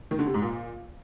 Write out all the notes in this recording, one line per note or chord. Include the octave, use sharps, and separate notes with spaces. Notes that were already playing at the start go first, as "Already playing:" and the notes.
D#3
D3
C3
G#2
A#2